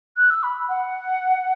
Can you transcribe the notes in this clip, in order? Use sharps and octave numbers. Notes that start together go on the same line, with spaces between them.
F#6
E6
B5
F#5